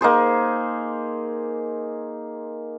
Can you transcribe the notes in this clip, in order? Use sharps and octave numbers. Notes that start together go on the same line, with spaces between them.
A#3 D#4 G#4 C5